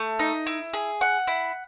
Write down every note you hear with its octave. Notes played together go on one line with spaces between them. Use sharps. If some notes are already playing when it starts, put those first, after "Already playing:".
Already playing: A3
D#4
E4
G#4
F#5
E4